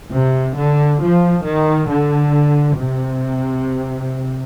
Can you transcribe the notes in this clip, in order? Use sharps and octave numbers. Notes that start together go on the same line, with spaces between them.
C3
D3
F3
D#3
D3
C3